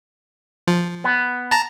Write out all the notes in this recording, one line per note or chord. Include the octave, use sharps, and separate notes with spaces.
F3
B3
A5 A#5